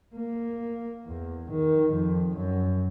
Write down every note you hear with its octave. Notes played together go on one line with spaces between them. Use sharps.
A#3
E2
D#3
F2
F#2